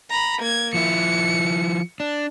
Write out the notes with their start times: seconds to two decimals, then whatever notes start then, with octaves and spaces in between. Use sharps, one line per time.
0.10 A#5 B5
0.42 A#3 G#6
0.74 F3 E4 C#7
2.00 D4